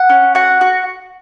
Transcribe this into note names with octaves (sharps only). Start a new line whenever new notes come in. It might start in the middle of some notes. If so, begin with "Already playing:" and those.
Already playing: F#5
C#4
F#4 F#5
F#4